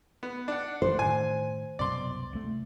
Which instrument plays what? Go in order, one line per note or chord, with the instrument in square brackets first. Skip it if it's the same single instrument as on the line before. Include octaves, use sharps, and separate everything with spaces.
[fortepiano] B3
D4 F#5
[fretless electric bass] F#1 E3 [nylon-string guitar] C5
[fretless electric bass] A2 D#3 [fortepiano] G#5
[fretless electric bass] C2 F#2 B2 [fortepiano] D5 C6
[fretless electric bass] C2 A3